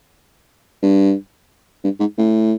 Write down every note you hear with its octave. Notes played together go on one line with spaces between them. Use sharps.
G2
G2
G#2
A2